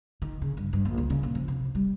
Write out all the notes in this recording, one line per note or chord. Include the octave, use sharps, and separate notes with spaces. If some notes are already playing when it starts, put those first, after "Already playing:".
D#3
C#3
G2
G2
A#1
C#2
C#3
A#2
F3
C3
G3